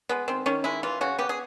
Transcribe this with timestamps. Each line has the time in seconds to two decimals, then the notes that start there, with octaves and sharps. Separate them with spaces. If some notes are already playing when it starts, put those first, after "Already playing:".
0.09 G#3 B3
0.28 D#3 C4
0.46 D#3 C#4
0.64 G#3 E4
0.83 E3 F4
1.01 C#3 F#4
1.19 B3 G4
1.29 G#4